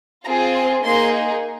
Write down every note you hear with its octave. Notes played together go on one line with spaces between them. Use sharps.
C4 F4 G#4 A#5
C6
A#3 D#4 G#4 C6